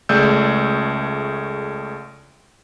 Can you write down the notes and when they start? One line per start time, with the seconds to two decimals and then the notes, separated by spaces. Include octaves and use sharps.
0.09 C#2 A3 G#4 D5 E6 G6